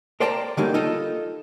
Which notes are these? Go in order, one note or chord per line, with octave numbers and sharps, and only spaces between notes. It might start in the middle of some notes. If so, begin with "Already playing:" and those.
A#4 C5 D5 G5 A5 A#5
D3 F#3 G3 A3 A#3 D#4
D#4 F4 A4 D#5